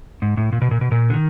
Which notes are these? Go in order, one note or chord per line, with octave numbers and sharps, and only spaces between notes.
G#2
A2
A#2
B2
A#2
B2
A#2
D3
D#3